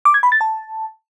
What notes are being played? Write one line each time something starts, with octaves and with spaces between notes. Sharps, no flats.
D6
G#6
B5
A6
A5